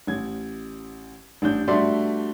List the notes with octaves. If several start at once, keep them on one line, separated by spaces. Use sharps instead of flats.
A1 G#6
A1 D4 G6
G2 A3 F#4 D5 E5 C6